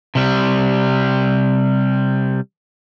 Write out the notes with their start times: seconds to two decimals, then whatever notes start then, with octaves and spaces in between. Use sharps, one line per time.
0.15 C3 G3